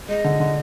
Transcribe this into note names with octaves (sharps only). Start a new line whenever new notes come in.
G#3 D#5
D3
D3